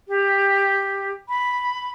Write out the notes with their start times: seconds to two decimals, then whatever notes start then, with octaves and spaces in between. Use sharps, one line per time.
0.08 G4
1.29 B5